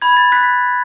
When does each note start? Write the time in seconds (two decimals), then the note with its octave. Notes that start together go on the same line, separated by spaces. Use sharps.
0.02 B5 G#6
0.17 A6
0.32 F#6 B6